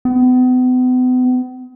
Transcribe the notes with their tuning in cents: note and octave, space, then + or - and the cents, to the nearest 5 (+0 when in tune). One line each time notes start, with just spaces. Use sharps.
B3 +40